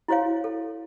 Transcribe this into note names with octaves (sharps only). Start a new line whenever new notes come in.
E4 F#4 C5 C#5 F5
A4